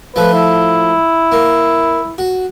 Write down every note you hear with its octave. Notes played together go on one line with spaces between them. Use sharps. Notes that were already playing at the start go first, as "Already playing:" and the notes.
F3 A3 B4
E4
A#3
F#4